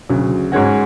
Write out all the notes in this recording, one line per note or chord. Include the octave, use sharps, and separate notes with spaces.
D2 C#3 F#3
G#2 G#3 C#4 F#4